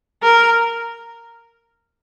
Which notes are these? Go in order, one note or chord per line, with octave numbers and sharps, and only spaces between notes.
A#4